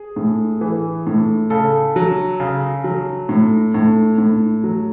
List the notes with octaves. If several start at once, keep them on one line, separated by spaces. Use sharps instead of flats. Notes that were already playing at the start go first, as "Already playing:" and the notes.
Already playing: G#4
A2
E3
A2
C#3 A4
F#3
C#3
F#3
A2
A2
A2
F#3